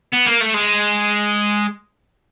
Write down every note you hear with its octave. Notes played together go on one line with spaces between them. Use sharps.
B3
A#3
A3
G#3